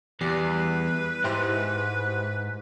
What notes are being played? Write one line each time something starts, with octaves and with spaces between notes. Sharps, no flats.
E2 G3 B4 D5 C7
G#2 E4 G4 C5